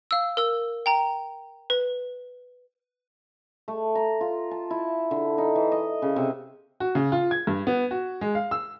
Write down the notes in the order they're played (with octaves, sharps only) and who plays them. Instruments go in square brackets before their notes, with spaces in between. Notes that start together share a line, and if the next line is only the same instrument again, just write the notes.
[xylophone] F5 E6
A#4 E6
G5 A#5
B4
[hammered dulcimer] A3
A#5
F4
A5
E4
D3
D#4
E3
D#5
C#3
C3
[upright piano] F#4
C#3
F4
G#6
G2
B3
F#4
G#3
F5
E6